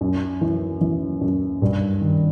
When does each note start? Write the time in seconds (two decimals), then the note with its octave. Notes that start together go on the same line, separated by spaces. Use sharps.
0.01 F#2
0.41 E3
0.81 E3
1.21 F#2
1.62 G2
2.01 D#3